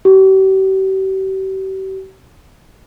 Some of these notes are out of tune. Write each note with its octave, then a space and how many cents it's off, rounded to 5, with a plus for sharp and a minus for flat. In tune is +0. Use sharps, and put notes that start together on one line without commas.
G4 -40